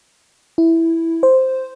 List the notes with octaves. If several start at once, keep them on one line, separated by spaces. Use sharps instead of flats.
E4
C5